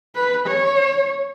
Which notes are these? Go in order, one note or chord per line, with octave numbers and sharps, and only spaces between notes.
B4
C#5